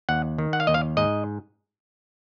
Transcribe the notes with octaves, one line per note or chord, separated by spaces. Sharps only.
D#2 F#5
D#3
F#5
F5
D#2 D#5
F5
G#2 D#5